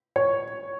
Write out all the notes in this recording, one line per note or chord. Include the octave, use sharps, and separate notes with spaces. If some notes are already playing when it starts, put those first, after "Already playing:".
C#5